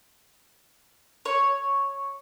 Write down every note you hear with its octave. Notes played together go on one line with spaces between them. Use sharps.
C#5